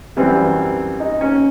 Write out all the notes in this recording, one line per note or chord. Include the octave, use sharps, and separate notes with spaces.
F#2 E3 G3 C4
D#4
C#4